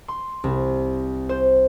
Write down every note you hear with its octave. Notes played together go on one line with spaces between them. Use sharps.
C6
C2
C5